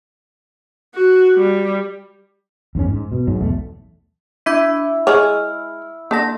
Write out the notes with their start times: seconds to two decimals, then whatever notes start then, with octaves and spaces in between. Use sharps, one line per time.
0.94 F#4
1.35 G3
2.75 E2 G#2 C#4
2.88 G#2
3.12 B2
3.27 G#2 F#3
3.41 B1 E2 A3
4.46 D4 E4 D6 G#6
5.07 G#3 G#4 C#5 F6
6.11 D3 A#3 A5 A#6